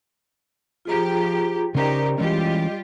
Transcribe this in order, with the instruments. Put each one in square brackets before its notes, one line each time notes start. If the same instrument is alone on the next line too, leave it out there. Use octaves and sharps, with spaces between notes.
[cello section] F3 G4 [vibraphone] F4 G#4 A#5
[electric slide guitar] C#3 C#4 C5 [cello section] D#4 G4 [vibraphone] A#4 D5 A#5
[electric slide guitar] E3 G#3 C#4 [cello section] G3 F4 G4 [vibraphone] D#5